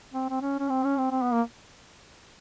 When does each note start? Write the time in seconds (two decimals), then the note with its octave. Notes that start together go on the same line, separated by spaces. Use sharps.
0.14 C4
0.30 C4
0.42 C#4
0.59 C#4
0.69 C4
0.84 C#4
0.97 C4
1.11 C4
1.22 B3
1.32 A#3